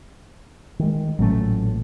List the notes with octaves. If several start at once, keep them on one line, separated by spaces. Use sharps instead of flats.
D#3 G#3
A1 A#2 F#3 A3 C#4